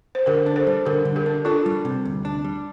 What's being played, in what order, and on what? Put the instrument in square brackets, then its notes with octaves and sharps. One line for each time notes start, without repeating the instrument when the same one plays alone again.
[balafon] C5
[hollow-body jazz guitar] D3 [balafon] G4 A#4
[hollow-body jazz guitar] D4
[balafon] A4 C5
[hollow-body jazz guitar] G3
[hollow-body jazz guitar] D3 [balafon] G4 A#4
[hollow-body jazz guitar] D3
[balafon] G4 A#4
[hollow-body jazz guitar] D4
[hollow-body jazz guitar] D4 [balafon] F4 A4
[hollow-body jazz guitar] G3
C3
D2
D4
G3